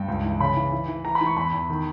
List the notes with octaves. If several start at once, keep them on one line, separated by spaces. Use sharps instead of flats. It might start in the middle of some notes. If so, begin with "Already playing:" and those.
Already playing: G2 G5
C#2
E3
C#3 B5
E3
E3
E3
E3 A#5
B5
E3
C#6
E2 B5
E2
D#3